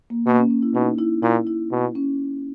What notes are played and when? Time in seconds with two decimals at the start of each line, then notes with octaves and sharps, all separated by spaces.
0.10 A#3
0.26 B2 A#3
0.38 C#4
0.51 C#4
0.62 E4
0.74 B2 D#4
0.99 E4
1.22 A#2 E4
1.47 E4
1.72 B2
1.95 C#4